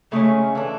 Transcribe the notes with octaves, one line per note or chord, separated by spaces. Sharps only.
C#3 G#3 A3 C#4
E3 A3 D4